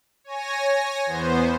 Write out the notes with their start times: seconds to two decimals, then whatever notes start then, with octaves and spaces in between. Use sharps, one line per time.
0.24 C#5 G#5 A#6
1.06 E2 B3 C5